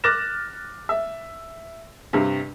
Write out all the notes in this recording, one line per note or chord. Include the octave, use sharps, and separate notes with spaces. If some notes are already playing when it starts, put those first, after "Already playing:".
D6 F6 F#6 A6 A#6 E7
E5
G2 C3